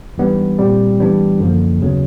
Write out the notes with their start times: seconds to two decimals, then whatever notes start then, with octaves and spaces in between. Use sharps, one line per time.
0.18 G#2 E3 G3 B3 D4
0.59 A#2 G3 C4
0.99 A2 E3 G3 B3 D4
1.39 F#2 D3 F3 A#3
1.80 D#2 C#3 F#3 B3